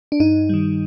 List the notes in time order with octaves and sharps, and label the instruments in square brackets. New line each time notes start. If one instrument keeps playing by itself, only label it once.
[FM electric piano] D4
G2 D#4
D#3 G3